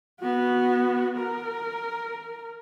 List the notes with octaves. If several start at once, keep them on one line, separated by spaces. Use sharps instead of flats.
B3 F#4
A#4